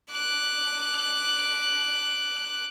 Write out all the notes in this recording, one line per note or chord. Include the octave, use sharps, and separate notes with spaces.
D6 F#6